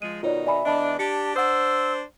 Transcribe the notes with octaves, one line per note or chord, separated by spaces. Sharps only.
F3 G#3 D#7
B2 D#3 D#4 F4 C#5 D5
D5 E5 G#5 B5
E2 D4 D#5 A5 B5
D4 G4 A5 C#7
D4 C5 F#5 D#6 E6